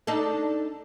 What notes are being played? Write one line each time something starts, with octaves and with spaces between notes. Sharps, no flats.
D4 D#4 A4